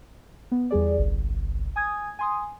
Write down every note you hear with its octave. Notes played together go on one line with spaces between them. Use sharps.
B3
E2 G3 G#4 D5
G1 C2
G#5 D#6 G#6
G#5 C6 D#6